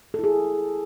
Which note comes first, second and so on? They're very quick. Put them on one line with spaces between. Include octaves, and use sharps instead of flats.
A4 E4 G#4